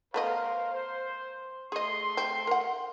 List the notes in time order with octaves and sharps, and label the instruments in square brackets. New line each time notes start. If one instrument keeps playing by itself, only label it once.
[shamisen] A3 B3 D#5 [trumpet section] A#4 C5 F5
[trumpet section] C5
[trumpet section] A3 C6 [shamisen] G#4 D#5
[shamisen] C4
A#4 F#5